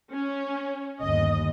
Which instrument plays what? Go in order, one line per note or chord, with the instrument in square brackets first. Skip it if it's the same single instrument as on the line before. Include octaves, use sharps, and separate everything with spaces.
[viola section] C#4
[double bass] G1 D#2 [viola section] D#5